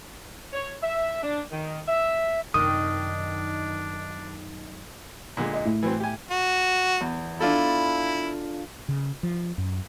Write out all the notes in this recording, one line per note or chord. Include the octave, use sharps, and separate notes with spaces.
C#5
E5
D4
D#3
E5
F#2 C3 D#3 D4 D#6
A#2 D3 G#3
D#5
A2
E3 F#3 C4
G4 G#5
F#4
E2
D4 E4 F4 A4
C#3
F3
F#2